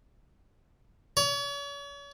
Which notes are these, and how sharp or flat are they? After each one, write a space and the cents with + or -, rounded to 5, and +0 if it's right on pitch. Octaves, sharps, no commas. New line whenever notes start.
C#5 +40